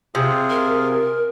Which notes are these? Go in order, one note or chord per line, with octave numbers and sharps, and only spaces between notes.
C3 F4 G#4
A#4